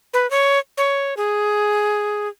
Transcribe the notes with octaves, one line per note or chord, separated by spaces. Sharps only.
B4
C#5
C#5
G#4